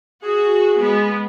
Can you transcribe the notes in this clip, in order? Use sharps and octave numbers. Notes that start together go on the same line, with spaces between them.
F#4 G#4
G#3 B3